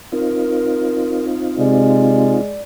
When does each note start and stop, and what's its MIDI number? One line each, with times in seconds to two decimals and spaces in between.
0.12 2.41 60
0.12 2.41 63
0.12 2.41 65
0.12 1.25 70
1.59 2.37 48
1.59 2.59 56
1.59 2.62 74